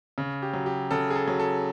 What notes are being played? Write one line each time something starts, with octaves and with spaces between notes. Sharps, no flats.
C#3
G4
F#3
G4
C#3 A4
G#4
A4
F#3
A4